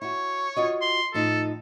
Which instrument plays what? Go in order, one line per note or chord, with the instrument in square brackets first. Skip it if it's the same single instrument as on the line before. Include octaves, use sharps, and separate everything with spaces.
[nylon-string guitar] E4 F#4 [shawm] C#5
[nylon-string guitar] F4 F#4 D#5
[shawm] C6
[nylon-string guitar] A2 F3 D#4 [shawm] A4